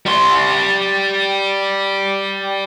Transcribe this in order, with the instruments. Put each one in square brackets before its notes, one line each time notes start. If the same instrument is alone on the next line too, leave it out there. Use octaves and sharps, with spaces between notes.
[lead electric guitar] G3 C6